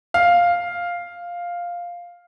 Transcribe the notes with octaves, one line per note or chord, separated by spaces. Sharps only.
F5